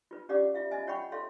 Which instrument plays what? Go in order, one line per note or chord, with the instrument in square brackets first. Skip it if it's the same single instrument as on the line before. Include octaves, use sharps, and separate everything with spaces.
[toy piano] F4 B4
C#4 G4 D5 F5 F#5 D6
F4 E5 F5
D#5 E5 G#5
F4 C#5 F#5 G5 B5 C#6
A4 C#5 E5 F5 C6